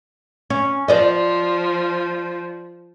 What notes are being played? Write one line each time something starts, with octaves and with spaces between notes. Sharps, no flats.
C#4
F3 C5 D5 D#5